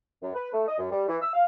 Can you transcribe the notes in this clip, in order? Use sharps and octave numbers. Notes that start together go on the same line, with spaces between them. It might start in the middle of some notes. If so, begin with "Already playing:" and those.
F#2
B4
A3
D#5
F#2
G3
E3
E6
F5